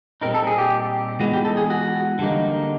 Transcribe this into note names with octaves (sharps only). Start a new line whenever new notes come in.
A#2 G3 C4 D#4 A#4
A4
G#4
G4
E3 G#3 B3 D#4 F#4
G4
A4
G#4
F#4
D3 G3 A#3 D#4